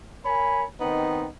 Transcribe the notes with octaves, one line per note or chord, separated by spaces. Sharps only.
A#4 C#5 G#5 B5
D#3 B3 C4 D#4